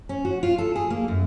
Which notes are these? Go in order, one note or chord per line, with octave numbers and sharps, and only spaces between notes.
C#4
F#4
F4
A4
G#4
A#3
F#2